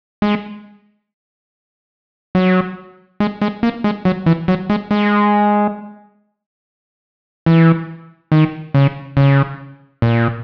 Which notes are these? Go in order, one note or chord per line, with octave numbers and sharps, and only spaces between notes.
G#3
F#3
G#3
G#3
A#3
G#3
F#3
E3
F#3
G#3
G#3
E3
D#3
C#3
C#3
A#2